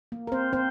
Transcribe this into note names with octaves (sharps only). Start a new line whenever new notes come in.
A#3
A#4
C4 C5
C4 C5